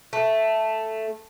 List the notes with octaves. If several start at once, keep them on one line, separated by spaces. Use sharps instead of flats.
A3